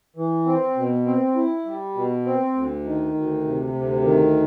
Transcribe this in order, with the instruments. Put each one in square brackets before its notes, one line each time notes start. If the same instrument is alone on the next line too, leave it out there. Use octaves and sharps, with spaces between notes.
[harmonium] E3
C4
B2
C4
E4
G3
B2
C4
D2
D#3
D2
C3
D2
D#3